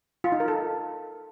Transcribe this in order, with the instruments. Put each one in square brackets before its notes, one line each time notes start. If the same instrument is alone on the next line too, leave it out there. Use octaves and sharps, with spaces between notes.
[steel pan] F4
D#4
A#4
A4